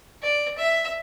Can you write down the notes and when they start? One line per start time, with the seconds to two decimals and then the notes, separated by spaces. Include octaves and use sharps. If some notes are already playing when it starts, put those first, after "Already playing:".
0.23 D5
0.58 E5